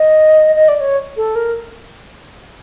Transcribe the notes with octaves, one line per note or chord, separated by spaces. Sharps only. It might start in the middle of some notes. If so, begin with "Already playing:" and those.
Already playing: D#5
D#5
D5
C#5
A4
A#4